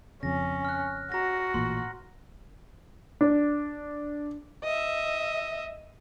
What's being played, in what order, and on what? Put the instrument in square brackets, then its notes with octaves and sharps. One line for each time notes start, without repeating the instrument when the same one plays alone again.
[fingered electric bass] F2 C#3 [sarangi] C#4 [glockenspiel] A#6
[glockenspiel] F6 F#6
[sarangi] F#4 [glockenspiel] A#5 A#6
[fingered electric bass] A1 A#2 [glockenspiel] C6
[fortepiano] D4
[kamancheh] D#5 E5